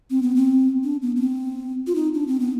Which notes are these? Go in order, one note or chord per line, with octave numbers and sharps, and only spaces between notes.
C4
B3
C4
D4
B3
B3
C4
F4
D#4
D4
C4
B3